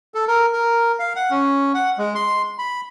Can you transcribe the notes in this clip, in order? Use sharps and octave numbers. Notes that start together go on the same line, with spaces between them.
A4
A#4
A#4
F5
F#5
C#4
F#5
G#3
C6
B5